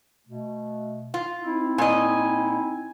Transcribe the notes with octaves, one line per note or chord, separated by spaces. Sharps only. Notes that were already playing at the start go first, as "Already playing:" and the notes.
B2 A3
F4
C4 D#4 E4
A#2 D#5 G#5